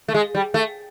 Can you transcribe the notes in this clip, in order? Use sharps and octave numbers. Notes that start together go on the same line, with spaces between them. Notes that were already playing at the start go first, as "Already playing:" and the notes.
A3
G#3
G3
A3